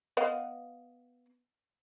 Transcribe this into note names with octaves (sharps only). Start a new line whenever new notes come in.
B3 D#5 F5